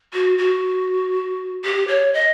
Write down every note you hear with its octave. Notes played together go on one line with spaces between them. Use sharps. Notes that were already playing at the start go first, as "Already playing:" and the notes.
F#4
F#4
G4
C#5
D#5